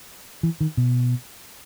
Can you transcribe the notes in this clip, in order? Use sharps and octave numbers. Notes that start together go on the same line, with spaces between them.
E3
D#3
B2